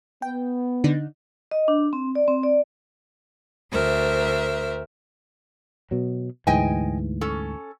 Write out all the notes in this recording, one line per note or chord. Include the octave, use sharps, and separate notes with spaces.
B3 G5
D3 D4 D#4
D#5
D4
C4
D5
C4
D5
D2 A#4 C5 E5
B2 F#3
D2 G#2 E3 D#5 G5 G#5
C#4 A4